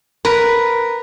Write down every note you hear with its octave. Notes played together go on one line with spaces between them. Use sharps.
A#4 B4